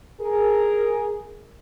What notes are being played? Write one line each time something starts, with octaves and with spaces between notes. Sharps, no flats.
G#4 A#4